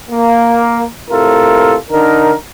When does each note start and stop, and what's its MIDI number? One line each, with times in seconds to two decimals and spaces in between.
0.11 0.85 58
1.10 1.75 45
1.10 1.75 48
1.10 1.75 65
1.10 1.75 69
1.10 1.75 70
1.91 2.33 50
1.91 2.33 63
1.91 2.33 70